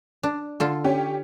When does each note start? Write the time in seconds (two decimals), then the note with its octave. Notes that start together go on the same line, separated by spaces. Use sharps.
0.23 D4
0.60 D3 F4 A4
0.84 C#4 G4